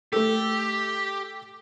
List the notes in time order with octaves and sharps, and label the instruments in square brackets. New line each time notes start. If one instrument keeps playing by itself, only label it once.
[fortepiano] A3 A4 [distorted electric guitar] G4